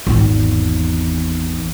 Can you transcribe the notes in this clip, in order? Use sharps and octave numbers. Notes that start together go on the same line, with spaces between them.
G#1 E2